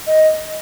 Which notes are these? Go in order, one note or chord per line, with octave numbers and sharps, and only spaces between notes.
D#5